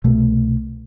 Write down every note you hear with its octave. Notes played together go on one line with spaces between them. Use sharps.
C2 B2 A3